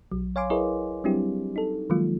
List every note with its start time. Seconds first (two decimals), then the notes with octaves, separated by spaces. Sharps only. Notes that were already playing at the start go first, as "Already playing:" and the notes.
0.12 B1 F#3
0.36 C#5 F5 G#5 C6 D6
0.50 E4 G#4 A#4 B4 C#5 D#5
1.04 F#3 G3 C4 D4 E4 G4
1.56 D#4 A4
1.90 D#3 F3 F#3 G#3 A#3 F4